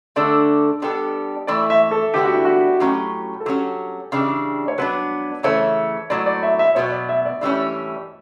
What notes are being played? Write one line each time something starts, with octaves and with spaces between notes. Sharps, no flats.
D3 A3 D4 A4 D5
G3 B3 D4 A4
E3 A3 E4 D5
E5
A4
D3 G3 B3 G4
F#4
E4
F#4
A2 F#3 C#4 G4
A4
F#3 C#4 F#4 G4
C#3 E3 G3 D4
C#5
F#3 B3 D4 B4
C#3 E3 A3 C#5
A2 F#3 B3 D5
D5
E5
E5
B2 F#3 B3 C#5
D5
E5
D5
A2 E3 G3 C#4 D5